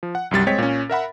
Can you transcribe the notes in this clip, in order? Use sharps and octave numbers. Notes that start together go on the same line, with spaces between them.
F3
F#5
C2 F#2 G3 A6
G#3 C4 C#5 D#5 G5 B6
A#2 C#4
A#4 E5 F#5 B5